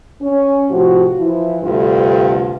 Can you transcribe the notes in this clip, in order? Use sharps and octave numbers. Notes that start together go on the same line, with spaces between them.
C#4
A2 C3 F3 F#4
E3 F3 E4
D2 G2 C3 F4 A4